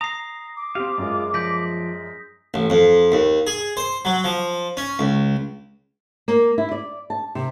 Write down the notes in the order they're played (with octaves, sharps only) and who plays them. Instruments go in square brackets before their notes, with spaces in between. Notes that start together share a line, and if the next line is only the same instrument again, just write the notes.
[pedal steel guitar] A#5 [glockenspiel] D#6 C7
[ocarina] D6
[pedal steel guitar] C4 F5 [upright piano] G4
[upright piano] F#2 G#3 [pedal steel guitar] F4
[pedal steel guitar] F3 D5 [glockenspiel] G6 A#6 B6
[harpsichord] A1
F2
D#2
G#4
C5
F#3
F3
C#4
C#2
[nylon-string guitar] A#3
E4
D5
A5
C3